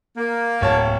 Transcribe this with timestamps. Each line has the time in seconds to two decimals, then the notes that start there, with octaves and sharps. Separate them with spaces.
0.16 A#3
0.61 D1 C#5 A5